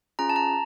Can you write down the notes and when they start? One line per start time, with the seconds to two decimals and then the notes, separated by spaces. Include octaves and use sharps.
0.19 C#4 F4 G#4 A#5
0.30 A5
0.36 A#5